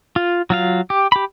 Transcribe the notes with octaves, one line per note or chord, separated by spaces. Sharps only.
F4
F#3 F4 F5
G4
G4 B5